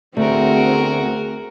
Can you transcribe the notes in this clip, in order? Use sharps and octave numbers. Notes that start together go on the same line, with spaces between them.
D2 A3 C4 F#4 G#4 A#4